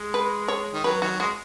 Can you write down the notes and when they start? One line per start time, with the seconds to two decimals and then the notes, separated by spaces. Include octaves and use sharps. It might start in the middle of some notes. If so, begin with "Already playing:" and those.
Already playing: G#3
0.14 B4
0.48 C#5
0.74 D#3
0.84 F#3 B4
1.02 D#3 F#3 F#4
1.20 G#3 F#4